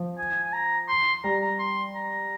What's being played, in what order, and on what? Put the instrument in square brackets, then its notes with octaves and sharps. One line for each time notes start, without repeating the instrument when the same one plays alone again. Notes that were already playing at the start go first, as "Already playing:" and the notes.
Already playing: [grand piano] F3
[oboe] G#5
G#5
A#5
C6
[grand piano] G3 [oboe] A#5
[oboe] A#5
C6
A#5